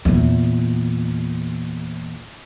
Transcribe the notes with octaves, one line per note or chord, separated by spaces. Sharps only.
E2 A#2